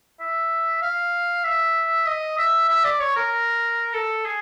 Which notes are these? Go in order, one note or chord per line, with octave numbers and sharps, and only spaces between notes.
E5
F5
E5
D#5
E5
E5
D5
C#5
A#4
A4
G#4